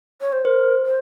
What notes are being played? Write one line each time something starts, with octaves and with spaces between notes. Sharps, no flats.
C#5
C5
A#4 C5
C5